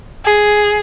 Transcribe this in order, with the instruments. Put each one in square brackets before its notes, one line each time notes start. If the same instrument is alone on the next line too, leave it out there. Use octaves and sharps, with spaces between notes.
[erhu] G#4